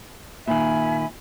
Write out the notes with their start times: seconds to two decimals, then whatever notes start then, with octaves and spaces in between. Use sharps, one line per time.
0.48 A#2 D#3 E5 G#5 B5